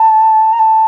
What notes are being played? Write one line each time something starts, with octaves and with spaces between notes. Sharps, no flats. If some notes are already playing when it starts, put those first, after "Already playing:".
Already playing: A5
A#5
A5